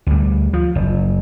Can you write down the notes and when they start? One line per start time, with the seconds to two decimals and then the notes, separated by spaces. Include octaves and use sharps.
0.07 D2 G3
0.53 F3
0.75 F#1